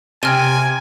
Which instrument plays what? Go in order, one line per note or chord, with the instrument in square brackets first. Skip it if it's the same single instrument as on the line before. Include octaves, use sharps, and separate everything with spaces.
[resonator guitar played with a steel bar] C3 [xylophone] G5 F6 D#7 [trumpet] G#5